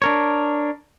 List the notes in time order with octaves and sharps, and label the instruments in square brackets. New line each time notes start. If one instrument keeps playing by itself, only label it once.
[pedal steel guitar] D4 A#4 C#5